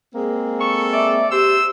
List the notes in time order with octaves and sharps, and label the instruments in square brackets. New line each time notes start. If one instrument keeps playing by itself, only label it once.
[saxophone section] G#3 A#3 C4
[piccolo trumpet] A4 [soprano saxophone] C#6
[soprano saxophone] D5 [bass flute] E5
[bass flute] G4 [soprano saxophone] C5 [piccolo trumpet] E6